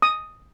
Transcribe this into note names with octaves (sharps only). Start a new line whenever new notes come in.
D#6